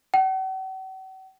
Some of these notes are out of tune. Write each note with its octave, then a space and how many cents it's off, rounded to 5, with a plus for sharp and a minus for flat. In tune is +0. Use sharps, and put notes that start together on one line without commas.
F#5 +45